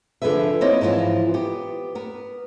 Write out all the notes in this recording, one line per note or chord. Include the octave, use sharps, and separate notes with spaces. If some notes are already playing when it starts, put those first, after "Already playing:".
D3 F3 G#4 B4 E5
A#3 C4 D#4 E4 C#5 D#5
G#2 E3 F3 E4 F4
B3 G4
B3 A#4